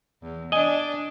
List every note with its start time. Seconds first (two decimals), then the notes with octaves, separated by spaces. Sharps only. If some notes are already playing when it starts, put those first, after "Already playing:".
0.23 E2
0.52 D4 D#5 G#5